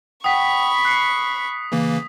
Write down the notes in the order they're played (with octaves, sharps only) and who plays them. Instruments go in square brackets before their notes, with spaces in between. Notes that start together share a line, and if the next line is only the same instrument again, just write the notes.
[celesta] F#5 G5 [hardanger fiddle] B5 C#6 [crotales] D#6 B6
[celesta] F#6 C7 C#7
[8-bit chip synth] C#3 E3 A#3